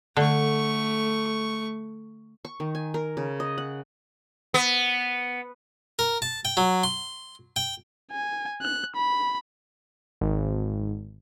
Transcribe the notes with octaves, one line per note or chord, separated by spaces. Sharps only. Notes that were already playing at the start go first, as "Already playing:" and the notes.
D3 A3 C#6
C#6
D#3
G#5
A#4
C#3
D#5
F#5
B3
A#4
A5
G5
F#3
C6
G5
G#5
F#6
B5
G#1